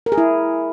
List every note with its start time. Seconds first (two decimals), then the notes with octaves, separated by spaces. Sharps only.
0.06 A#4
0.12 G#4
0.18 E4